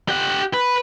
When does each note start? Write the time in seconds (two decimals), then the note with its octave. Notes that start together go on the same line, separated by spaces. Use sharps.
0.08 G4 F#5
0.54 B4